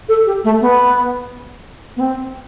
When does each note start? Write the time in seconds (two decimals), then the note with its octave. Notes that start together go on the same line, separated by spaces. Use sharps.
0.09 A4
0.26 G4
0.44 A3
0.61 B3
1.97 B3
2.00 C4